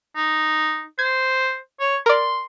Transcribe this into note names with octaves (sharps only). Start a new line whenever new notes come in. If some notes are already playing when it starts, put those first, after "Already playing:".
D#4
C5 G#6
C#5
A#4 D5 C6